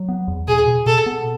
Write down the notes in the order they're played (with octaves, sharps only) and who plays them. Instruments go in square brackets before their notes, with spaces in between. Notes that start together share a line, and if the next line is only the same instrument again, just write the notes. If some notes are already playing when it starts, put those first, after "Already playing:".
Already playing: [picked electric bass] F#3
B3
E2
[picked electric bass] B2 [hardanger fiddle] G#4
[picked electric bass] B2
[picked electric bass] B2 [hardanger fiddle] A4
[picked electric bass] B3